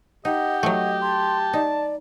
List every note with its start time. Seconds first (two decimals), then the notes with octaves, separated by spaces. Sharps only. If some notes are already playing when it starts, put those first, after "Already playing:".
0.25 D#4 G4 D#5 F#5
0.63 F#3 A3 D#5
1.02 A5 C6
1.53 D#4 D5